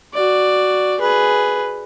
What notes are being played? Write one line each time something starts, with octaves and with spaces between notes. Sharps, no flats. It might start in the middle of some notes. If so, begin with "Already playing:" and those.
F#4 D5
G#4 B4